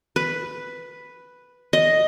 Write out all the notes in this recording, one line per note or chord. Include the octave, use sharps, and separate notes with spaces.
B4
D#5